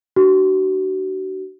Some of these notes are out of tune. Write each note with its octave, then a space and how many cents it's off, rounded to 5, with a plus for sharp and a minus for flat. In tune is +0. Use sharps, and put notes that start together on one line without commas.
D4 +30 F#4 +35